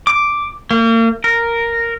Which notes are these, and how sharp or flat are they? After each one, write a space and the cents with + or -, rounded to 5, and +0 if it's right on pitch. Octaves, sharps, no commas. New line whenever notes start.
D6 +0
A#3 -40
A#4 -5